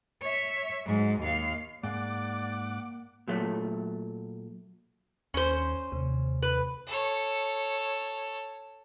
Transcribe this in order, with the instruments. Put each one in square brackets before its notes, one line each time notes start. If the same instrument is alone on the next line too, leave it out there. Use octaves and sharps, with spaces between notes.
[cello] C#5 E5
G#2 F#3
D#2 F5
[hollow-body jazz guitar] G#2 [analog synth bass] A#3 [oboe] D5 [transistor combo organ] F#5 D6
[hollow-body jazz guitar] A#2 F#3 A3
[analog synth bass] D#2 [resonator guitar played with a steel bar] C#4 C5
[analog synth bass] D#2 [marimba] C3
[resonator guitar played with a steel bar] B4
[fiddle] A4 C#5